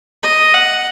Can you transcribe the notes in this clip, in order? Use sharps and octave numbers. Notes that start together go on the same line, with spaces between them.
D#5
F#5